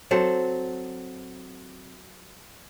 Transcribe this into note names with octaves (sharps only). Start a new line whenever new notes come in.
F#3 C4 A4